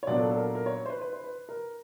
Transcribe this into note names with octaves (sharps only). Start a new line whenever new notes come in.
C#5
A#2 F#3 B3 D4 D5
A4
A4
A#4
A4
A#4
C#5
C5
B4
B4
C5
B4
A#4